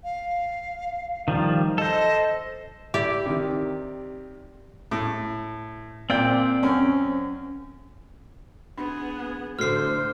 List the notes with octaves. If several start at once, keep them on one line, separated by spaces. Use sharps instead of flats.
F5
D#3 F3 G3
A4 C5 D#5
E4 G4 D5
C3 D#3
A2
A#2 C4 D5 G5
F#2 C#4
B3 D4 G#4 B5
A2 D3 F#4 A4 C5 F6 C7